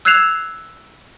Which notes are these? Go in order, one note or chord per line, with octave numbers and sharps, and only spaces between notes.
E6 F#6 G#6 C7 E7 F7